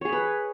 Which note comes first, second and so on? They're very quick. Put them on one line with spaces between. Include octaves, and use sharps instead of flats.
C#5 G#4 B5 B4